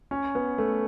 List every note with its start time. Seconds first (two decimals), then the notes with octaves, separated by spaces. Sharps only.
0.11 C#4
0.35 B3
0.58 A3